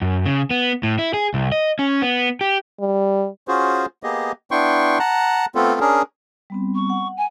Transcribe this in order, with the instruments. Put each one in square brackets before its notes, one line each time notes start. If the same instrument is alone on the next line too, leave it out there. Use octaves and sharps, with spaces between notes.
[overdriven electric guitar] F#2
C#3
B3
A2
E4
G#4
C2
D#5
C#4
B3
G4
[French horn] G3
[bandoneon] C#4 F4 F#4 G#4 C5
A#3 B3 G4 G#4 D#5
B3 D4 E4 G5 C6 C#6
F#5 A5 A#5 F#6
A3 B3 C4 F4 A4
C#4 D4 G#4 A#4
[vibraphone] G3 B3 C4
[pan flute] C#6
[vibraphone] F#5
[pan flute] G#5